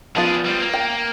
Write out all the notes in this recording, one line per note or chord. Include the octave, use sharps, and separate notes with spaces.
F3 B3 D4 F4 G#4
G3 C4
A#3
G5